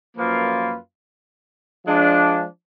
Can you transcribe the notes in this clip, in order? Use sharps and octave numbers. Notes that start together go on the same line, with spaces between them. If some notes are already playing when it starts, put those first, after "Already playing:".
F#2 F3 A#3 F4 B4
F3 G#3 D4